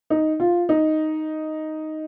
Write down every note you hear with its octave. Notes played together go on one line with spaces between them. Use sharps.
D#4
F4
D#4